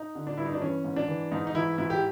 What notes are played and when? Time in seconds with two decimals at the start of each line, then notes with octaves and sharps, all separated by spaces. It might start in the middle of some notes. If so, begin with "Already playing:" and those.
Already playing: D#4
0.15 D3
0.27 D4
0.37 G2 E4
0.46 D#4
0.53 D4
0.61 E3 C#4
0.85 G#2
0.96 D4
1.08 E3
1.32 G#2 D#4
1.47 D#4
1.54 E3 E4
1.78 G#2 E4
1.90 G4